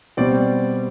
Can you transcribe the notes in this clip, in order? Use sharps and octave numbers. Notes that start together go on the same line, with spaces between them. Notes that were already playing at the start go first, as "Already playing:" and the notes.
B2 G3 C4 D5